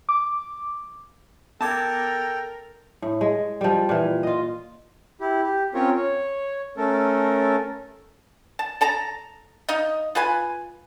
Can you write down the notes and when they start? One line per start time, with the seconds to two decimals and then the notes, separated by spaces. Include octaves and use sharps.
0.09 D6
1.61 B3 A4 A#4 G5 A5 D6 G#6
3.02 A2
3.21 G#3
3.61 F3 G3
3.89 A#2 E3
4.23 F4 D#5
5.21 E4 G4
5.43 G4
5.74 C4 C#4 F4 A#4 C#5
5.96 C#5
6.77 A3 C#4 A4 A#4
8.59 A5
8.81 A4 A5 A#5
9.69 D#4 D#5 F5
10.15 F4 B4 G#5